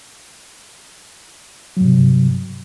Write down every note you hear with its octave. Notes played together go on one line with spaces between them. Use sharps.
G2 C3 F#3